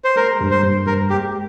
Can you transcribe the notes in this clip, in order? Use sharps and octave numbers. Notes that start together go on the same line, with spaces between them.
C5
G#3 A#4
G2
C5
G2
G2 A#4
G#3 G4